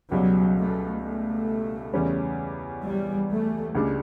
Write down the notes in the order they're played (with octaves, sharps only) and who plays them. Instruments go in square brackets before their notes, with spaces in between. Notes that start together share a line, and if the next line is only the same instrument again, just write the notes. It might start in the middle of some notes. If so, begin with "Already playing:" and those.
[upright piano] C#2 B2 G3 [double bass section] F#3
[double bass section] A3
A3
[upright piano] E2 C#3 G3 C#4
[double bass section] G3
A3
[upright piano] C#2 C#3 G3 D4